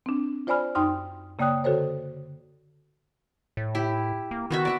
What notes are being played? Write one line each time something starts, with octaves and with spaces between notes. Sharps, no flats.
C4 D4
F4 C5 D5 G#5 B5 F6
F#2 D#4 G5 C6 D#6 F6
C#3 A#3 D5 G5 D#6 F#6
D3 F#4 A4 C5 C#5
A2
E4 G4
A#3
D#3 B3 F#4 E5
D5 E5 F#5